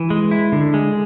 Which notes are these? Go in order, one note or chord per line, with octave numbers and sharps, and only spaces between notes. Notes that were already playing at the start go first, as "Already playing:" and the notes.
Already playing: E3
G#3
E4
D3
G#3